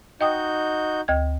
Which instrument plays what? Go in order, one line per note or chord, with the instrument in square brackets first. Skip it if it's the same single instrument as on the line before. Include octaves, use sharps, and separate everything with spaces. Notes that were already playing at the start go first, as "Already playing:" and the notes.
[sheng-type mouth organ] D#4 F#4 G6 [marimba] D#5 G5 D#6
[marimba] D2 G5 G#6